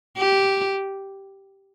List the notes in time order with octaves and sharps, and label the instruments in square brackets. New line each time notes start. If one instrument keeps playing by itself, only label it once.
[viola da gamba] G4